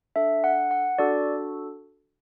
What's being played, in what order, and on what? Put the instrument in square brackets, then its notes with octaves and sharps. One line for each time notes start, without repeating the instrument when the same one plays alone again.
[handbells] D4 A4 E5
F#5
F#5
D4 F#4 A4 D5